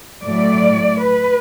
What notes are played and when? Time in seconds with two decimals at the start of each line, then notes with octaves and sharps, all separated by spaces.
0.24 A2 F#3 A3 D5
1.03 B4